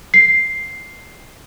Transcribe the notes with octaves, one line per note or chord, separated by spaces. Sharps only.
C7